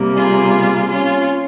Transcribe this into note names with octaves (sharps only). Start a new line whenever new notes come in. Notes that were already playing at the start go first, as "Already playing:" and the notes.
Already playing: C3 G3 A#3
F4 G#4
C#4 F4